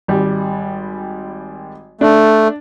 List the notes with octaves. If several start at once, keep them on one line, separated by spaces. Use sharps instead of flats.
G#1 G3
A3 D4